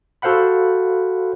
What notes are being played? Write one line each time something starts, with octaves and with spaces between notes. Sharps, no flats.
F#4 A4 C5 F5 F#5 B5